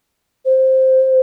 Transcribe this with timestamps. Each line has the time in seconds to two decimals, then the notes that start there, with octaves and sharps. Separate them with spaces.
0.45 C5